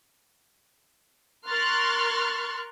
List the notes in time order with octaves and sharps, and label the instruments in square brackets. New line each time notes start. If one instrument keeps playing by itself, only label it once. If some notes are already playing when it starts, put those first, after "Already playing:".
[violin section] A#4 C6 C#6 F6 F#6 A6